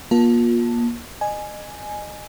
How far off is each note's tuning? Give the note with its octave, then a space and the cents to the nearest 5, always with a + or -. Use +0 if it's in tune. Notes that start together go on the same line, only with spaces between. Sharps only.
A#3 +35 F4 +25 A5 +0
D#5 -30 G#5 +5